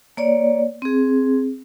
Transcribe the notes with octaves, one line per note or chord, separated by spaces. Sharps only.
A#3 C#5 D5
C4 G#4